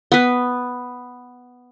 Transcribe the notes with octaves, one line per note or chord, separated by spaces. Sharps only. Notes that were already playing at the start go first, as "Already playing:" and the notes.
B3 B4